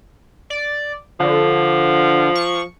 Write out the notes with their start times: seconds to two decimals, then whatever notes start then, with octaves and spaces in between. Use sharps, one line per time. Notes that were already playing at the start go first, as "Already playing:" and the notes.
0.50 D5
1.20 D3 F3
2.35 C#6